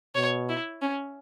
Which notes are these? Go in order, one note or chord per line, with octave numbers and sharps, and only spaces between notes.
B2 C#5
E4
C#4